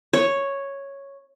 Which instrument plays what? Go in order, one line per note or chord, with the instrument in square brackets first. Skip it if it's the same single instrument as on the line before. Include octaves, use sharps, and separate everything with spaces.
[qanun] C#5